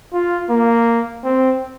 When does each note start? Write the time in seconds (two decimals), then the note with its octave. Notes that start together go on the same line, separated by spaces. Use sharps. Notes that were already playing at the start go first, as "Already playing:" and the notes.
0.13 F4
0.50 A#3
1.24 C4